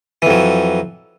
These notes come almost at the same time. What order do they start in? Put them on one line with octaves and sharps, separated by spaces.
E3 F2 F#3